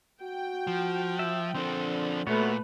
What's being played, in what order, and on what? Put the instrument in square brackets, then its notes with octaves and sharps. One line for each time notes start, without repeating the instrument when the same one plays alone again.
[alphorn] F#4 [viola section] G5
[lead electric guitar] F3
[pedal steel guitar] E5
[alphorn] D3 [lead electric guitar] F3 D4 [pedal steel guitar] C4
[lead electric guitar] A#2 [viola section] A3 B4 [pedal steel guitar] B3 F#4 C#5